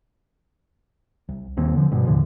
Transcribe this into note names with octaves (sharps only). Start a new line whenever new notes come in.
C2
D#1 D#2 C4
D3 F3
G2 B2
D#2 A2 D3 F3